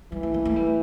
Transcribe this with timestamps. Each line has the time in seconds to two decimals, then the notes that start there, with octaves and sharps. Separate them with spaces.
0.12 E3 G3
0.23 A3
0.34 A#3
0.45 A3
0.56 G3